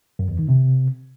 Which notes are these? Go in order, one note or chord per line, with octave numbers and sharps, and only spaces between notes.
F#2
E2
D#3
C3